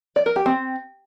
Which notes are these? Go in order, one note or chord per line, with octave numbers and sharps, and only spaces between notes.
D5
A#4
G4
C4